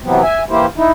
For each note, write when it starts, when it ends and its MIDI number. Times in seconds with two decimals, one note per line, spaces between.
0.04 0.22 48
0.04 0.22 52
0.04 0.22 54
0.04 0.22 59
0.04 0.22 60
0.22 0.43 76
0.22 0.43 80
0.49 0.66 52
0.49 0.66 58
0.49 0.66 64
0.49 0.66 67
0.49 0.66 72
0.77 0.92 63
0.77 0.92 64